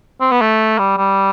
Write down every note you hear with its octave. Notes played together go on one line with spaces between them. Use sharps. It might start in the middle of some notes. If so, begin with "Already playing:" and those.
C4
B3
A3
G3
G3